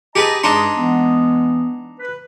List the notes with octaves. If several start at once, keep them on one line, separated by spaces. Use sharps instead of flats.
G4 G#4 B4 D#5 A5 A#5
G2 G#3 D4 D#4 G#4 C6
E3 G#3 B3
B4